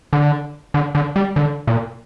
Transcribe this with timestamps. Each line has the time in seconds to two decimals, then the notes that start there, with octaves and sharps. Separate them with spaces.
0.13 D3
0.74 D3
0.95 D3
1.16 G3
1.36 D3
1.67 A#2